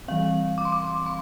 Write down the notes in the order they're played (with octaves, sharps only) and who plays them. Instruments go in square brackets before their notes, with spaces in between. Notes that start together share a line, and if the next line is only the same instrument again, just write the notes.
[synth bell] E3 G3 C4 F5
D6
C6
D6
C6